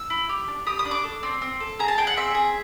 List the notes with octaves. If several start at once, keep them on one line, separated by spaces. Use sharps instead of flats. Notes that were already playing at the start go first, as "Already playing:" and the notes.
Already playing: E6
E4
G4
D4
G4 D#6
D#6
D4
D6
A4
C4
C4
A4
G#4 A#5
A5
G#4 G5
F#5
C4 E5
G#4